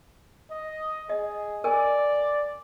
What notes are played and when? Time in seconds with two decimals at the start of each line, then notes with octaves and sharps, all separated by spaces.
0.50 D#5
1.10 G#4 D#5
1.64 A#4 D5 G#5